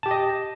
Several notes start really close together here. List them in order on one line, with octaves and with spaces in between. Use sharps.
A5 G4 G5 D#5